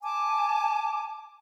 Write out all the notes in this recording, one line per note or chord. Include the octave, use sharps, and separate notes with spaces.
G#5 A5 D6